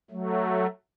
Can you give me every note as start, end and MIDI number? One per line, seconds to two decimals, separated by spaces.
0.11 0.66 54
0.11 0.66 57